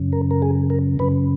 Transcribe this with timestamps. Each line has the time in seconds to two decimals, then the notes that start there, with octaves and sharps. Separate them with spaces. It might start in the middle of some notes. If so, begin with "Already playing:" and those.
Already playing: F#2 C#3
0.13 A#4
0.31 A#4
0.42 G#4
0.70 A#4
0.99 F#2 C#3 B4